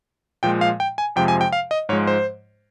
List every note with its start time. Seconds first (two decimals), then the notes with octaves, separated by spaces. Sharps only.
0.43 A#2 F3 G#3 G5
0.61 F5
0.80 G5
0.98 G#5
1.16 F2 C3 F3 G#3 G5
1.28 G#5
1.41 G5
1.53 F5
1.71 D#5
1.89 G#2 F3 G#3 C#5
2.07 C5